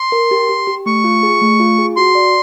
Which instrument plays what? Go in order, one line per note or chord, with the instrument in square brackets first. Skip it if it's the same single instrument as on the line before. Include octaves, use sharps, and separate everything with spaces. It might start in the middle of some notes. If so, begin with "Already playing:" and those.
Already playing: [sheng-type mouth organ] C6
[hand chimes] A#4
G4
G4
G4
[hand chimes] A3 [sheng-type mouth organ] C#6
[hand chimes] F4
G#4
A3
F4
G#4
[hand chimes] F#4 [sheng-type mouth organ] C6
[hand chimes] D5